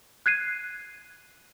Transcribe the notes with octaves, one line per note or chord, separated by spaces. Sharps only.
F#6 G#6 C7 D#7